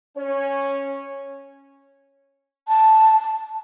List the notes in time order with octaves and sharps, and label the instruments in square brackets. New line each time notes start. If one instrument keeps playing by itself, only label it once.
[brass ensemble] C#4 C#5
[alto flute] A5